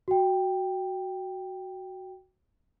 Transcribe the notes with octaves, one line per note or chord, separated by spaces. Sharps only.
F#4 G5